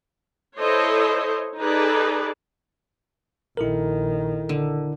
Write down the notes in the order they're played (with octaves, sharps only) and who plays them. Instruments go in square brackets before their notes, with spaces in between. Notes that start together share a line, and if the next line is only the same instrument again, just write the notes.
[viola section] E4 A4 C5 C#5 D#5
D#4 G#4 A4 B4 D5
[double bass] A#1 D#3 [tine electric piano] E4 A4 A#4
[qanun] D3